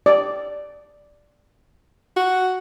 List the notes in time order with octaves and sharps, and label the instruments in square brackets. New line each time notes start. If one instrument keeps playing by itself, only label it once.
[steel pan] D5
[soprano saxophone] F#4